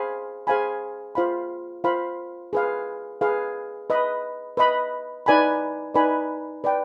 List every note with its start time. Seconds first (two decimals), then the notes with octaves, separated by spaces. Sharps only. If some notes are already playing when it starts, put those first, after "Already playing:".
Already playing: G#4 C5 F5 G#5 B5
0.47 G#4 C5 F5 G#5 B5
1.15 F4 C5 F5 B5
1.84 F4 C5 F5 B5
2.53 G#4 B4 F5
3.21 G#4 B4 F5
3.90 B4 D#5 B5
4.57 B4 D#5 B5
5.26 D#4 B4 D5 G#5 B5
5.94 D#4 B4 D5 G#5 B5
6.64 B4 D5 G5